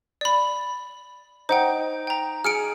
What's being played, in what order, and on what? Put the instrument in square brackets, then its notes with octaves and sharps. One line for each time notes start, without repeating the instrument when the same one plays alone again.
[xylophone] D5 B5
[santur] D#4 [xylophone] C5 F#5 G5
[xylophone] G5 A#5
[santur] G#4 [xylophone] F6 C#7 D7